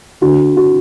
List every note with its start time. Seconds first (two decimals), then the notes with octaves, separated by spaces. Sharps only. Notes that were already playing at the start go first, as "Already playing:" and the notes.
0.21 D3 F#4
0.57 F#4